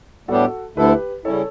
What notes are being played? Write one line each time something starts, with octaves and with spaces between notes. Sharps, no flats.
A2 G3 B3 D4 F#4 G4 A4
D2 D3 A3 E4 G4 A4 B4
C#3 G3 C#4 E4 A4 C#5